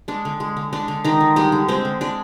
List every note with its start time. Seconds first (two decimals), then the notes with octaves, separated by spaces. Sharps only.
0.08 G#3 D4
0.25 D3
0.40 G#3
0.57 D3
0.73 G#3 D4
0.88 D3
1.04 D#3 G#3 D#4
1.21 D3
1.36 G3 G#3 G4
1.52 D3
1.68 G#3 C4 C5
1.85 D3
2.01 G#3 D4 D5